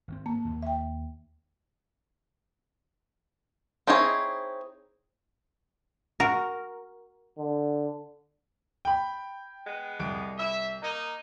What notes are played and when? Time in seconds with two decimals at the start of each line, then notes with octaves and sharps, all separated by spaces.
0.08 G#1 D3 C4
0.26 A#3 A5
0.45 D#2
0.63 E5 G5
3.87 C4 D#4 E4 G#4 C#5
6.20 F#4 A#4
7.38 D3
8.85 G5 B5
9.65 G#3 B3
10.00 C2 D7
10.38 E5
10.82 A#3 D#4